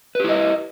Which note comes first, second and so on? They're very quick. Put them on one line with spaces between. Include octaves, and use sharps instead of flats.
B4 G4 E4 D#5